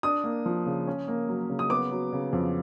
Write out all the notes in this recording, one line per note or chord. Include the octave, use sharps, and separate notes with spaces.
D4 D#6
A#3
F3
C#3
C#4
A#3
F#3
C#3
D#6
B3 D6
F#3
C#3
F2